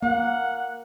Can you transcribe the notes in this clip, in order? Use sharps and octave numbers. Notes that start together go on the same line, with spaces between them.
A#3 F#5